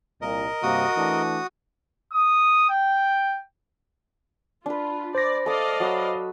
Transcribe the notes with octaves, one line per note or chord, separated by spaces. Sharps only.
C2 A#2 A#4 D#5
G2 C3 A#3 F#4 D#6
E3 A3 D4
D#6
G5
D4 F4 B4
C5 D5 A#6
A4 D5 D#5 F5 D#6
F#3 B4 E6